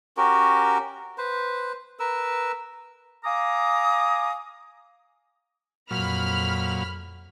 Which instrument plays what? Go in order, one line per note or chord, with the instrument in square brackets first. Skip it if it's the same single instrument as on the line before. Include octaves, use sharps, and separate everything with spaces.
[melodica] C#4 F#4 G4 A#4
B4 C5
A#4 B4 E6
[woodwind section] F5 G#5 A#5 D6 D#6
[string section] F2 B5 F6 [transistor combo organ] A#2 F#3